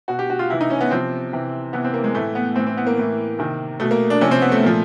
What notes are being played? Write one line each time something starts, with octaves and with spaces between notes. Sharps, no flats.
B2 F#4
G4
F#4
F4
C3 E3 E4
D#4
C#4
B3
C3 F3 C4
C3 E3
C3 E3 B3
C4
A#3
G#3
A2 E3 A3
B3
A2 E3 C4
C4
B3
A#3
A2 E3
C3 D#3
B2 A3
A#3
D4
C3 F3 C#4
C4
B3
A3
A#2 F3